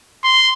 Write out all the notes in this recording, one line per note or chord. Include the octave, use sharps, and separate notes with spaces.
C6